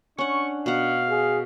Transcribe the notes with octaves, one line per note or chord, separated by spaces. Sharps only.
C#4 D4 F#5 C#6
B2 F5 F#5
G#4